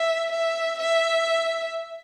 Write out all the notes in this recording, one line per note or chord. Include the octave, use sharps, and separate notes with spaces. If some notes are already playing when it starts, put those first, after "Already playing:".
Already playing: E5
E5
E5